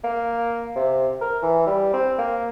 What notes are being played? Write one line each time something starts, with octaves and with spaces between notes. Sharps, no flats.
A#3
C3
A#4
E3
G3
C4
A#3